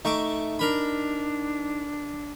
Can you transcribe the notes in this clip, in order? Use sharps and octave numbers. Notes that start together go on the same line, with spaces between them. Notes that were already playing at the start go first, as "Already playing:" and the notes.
A3 D#4 C#6 D6
D4 A#4 B5